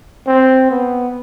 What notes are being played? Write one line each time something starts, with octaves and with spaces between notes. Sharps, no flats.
C4
B3